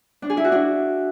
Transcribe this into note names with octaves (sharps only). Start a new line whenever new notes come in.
D4
G#4
E4
F#4
D4